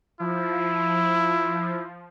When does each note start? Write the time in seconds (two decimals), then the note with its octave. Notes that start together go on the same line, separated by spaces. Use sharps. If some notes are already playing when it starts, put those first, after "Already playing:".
0.20 F3 E4